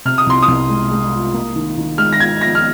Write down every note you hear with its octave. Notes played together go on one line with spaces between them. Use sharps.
C3 F6
D#6
C2 C6
D#6
C2
G#3
G#3
F4
A#3
D#3
D#3
G#3 F6
A#6
F4 G#6
F3 A#6
F6